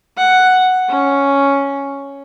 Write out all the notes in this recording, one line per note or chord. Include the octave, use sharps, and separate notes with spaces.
F#5
C#4